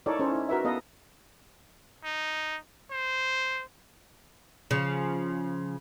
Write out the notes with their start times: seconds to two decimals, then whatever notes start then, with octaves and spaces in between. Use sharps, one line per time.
0.06 D#4 E4 A4 A#4 C#5 D5
0.19 C#4 E4 A4 C5
0.31 D#4 E4
0.49 F#4 A#4 B4 E5
0.65 B3 A4 B4 D#5 F5
2.04 D#4
2.91 C5
4.71 C#3 F3